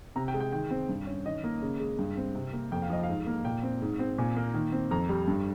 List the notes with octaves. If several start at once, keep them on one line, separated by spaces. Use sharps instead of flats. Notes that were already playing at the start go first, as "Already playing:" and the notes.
C3 A#5
G5
G#3
G5
D#3 G5
C4
G2
C#4
D#3 D#5
A#3
C#3
G#3
G2
C4
C3
A#3
F2 G5
F5
F3 D#5
F5
G#2
A#3
A#2 G5
C4
G#2
C4
A#2 G#5
A#3
D#3
C4
F2 A#5
G3
G2